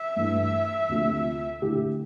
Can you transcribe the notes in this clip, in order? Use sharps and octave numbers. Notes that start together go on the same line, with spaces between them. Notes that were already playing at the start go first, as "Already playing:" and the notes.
Already playing: E5
G2 E3 A3
D2 C3 F3 A3
D3 A3 E4 G4